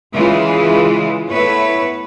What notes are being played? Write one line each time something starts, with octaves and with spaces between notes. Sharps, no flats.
C#3 E3 G#3 F4
A3 B3 E4 B4 C#5